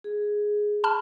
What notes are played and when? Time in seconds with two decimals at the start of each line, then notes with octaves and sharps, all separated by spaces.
0.04 G#4
0.84 A5 B5 F6